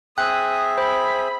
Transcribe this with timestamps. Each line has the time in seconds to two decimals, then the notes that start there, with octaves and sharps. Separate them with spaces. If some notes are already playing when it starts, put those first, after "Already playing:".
0.18 C4 G#4 E5 G5 D#6 F#6
0.78 C5 B5